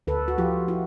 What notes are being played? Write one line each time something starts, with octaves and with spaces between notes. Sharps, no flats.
D2 A4 B4
F#4
F3 F4 G4
E4 F#4